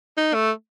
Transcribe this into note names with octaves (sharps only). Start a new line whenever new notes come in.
D#4
A3